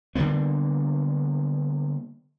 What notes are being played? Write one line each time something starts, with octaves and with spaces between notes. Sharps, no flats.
D3 G3 A#3 B3